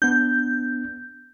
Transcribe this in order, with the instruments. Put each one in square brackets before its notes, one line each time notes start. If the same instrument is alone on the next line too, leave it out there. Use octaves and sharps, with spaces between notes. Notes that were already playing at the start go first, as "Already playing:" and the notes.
[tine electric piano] B3 D4 [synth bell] G6